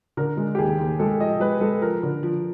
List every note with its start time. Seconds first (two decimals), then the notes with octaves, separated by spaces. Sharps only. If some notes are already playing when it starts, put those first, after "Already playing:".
0.17 D3 A#4
0.37 G#3
0.55 G4
0.58 D#2 G#4
0.79 D#2
0.99 G#3 A4
1.20 F3 D#5
1.40 G#3 B4
1.61 G#3 A4
1.81 F3 A#4
2.03 D3
2.23 F3